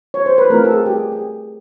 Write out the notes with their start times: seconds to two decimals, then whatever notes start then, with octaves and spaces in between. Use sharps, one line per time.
0.14 C#5
0.26 C5
0.38 B4
0.50 A3 C4 F4 A#4
0.64 A4
0.71 G#4
0.86 G4
0.92 G#4
1.12 G#4